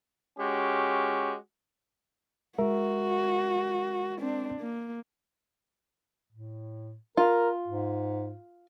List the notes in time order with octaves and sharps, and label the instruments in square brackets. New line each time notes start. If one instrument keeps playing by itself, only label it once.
[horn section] G#3 C#4 F#4 G4
[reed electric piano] G#3 A#4 E5 [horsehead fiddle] F#4
[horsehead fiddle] C4 D4
A#3
[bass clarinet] A2
[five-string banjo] F4 [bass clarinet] A#4
[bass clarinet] G#2